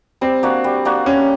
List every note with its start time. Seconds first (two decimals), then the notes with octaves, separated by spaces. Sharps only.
0.21 G3 C4
0.43 A#3 D4 F#4
0.64 G3
0.85 A#3 D4 F#4
1.06 G3 C#4